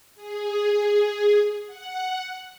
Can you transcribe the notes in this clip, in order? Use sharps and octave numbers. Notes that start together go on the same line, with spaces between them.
G#4
F#5